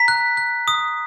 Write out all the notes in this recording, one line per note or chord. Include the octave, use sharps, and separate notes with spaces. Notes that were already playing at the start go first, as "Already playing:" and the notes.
Already playing: A#5 B6
F#6
F#6
D#6